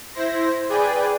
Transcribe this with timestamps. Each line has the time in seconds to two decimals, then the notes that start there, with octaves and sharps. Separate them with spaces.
0.14 E4 C5 A#6
0.69 G#4 B4 D5 G5 G#5